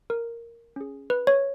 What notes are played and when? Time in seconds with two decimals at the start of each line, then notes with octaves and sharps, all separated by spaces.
0.10 A#4
0.76 C#4 G#4
1.10 B4
1.27 C#5